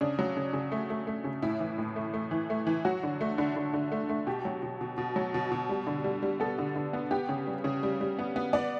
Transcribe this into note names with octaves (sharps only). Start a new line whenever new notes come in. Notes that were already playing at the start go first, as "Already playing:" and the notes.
C#3 D4
F#3
C#3
C#3
A3
A3
A3
C#3
A2 E4
E3
A2
A3
A3
E3
A3
E3
F#3 F#4
D3
A3
D3
D3
D3
A3
A3
B2 G4
F#3
B2
B2
B2
F#3
B2
B2
G3
D3
G3
G3
B3 A4
D3
D3
B3
B3 G4
C#3
G3
C#3
G3
G3
B3
B3
B3 D5